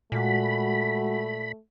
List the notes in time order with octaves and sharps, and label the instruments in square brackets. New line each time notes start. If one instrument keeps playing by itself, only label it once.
[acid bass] A#2 [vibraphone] G#3 F#4 F#5 [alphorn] A3 [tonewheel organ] B5